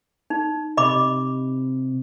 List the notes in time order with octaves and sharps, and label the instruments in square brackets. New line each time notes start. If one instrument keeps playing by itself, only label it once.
[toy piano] D#4
[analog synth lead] C3 [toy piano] D#5 B5 D6